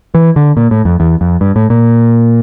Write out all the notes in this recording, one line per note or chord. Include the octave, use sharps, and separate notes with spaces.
E3
D3
A#2
A2
F2
E2
F2
G2
A2
A#2